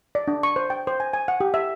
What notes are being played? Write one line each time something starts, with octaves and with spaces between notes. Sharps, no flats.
D5
D4
C#6
C5
G5
C5
G#5
G#5
F#5
G4
E5